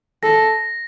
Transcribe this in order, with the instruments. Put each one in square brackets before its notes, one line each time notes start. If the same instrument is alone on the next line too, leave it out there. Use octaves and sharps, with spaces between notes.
[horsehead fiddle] A4 [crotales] A#6